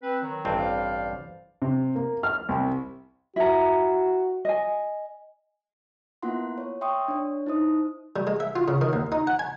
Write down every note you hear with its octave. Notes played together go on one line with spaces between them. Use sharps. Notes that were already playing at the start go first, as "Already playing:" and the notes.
C4 B4
D#3 F#3
A1 G2 C4
C5 D5 F5
C3
A#3
F6
C2
E4 F#4 A#5
D#5 G#5
A#3 B3 E4 F4 F#5 C6
C#5
E5 G5 C6 C#6 D#6
D4 C#5
D#4 E4 C5 D#6
G3
G#3
E5
F4
C#3
D#3
D#2
D#4
F#5
G#5